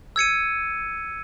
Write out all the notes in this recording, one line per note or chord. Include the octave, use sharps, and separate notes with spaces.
E6 G#6 C#7 D#7